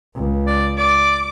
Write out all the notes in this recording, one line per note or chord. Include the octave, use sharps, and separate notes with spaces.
C#2
D5
D5 D6